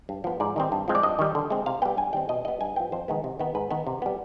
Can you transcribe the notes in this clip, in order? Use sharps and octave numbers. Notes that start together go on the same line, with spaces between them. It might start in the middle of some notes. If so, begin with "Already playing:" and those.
G2
F3 B3
G#2 D5
D#3 G3 C4
G2
F3 G#3 C4
D5
G2 D#5
D#3 G3
D3
G#3 C4
C3 F5
G3 B3 G5
G2 G#5
D#3 G3 C4 G5
B2 D#5
G3 B3 D#5
G2 G#5
F3 B3 G5
F2 C5
D#3 G#3 B3
C3
D#3 B3
G#2 B4
D#3 B3
C3
G3 B3